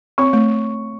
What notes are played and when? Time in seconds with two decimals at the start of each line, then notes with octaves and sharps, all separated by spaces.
0.18 C4 C#5 C#6
0.33 A3